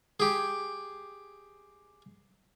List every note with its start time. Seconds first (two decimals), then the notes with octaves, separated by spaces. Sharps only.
0.20 G4 G#4